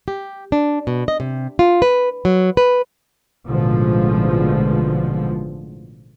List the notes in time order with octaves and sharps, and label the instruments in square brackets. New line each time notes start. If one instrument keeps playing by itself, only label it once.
[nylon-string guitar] G4
D4
B2
D#5
C3
F4
B4
F#3
B4
[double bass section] A1 B2 D3 F3 G#3